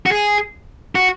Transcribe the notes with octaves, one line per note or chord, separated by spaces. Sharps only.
F#4
G#4
F#4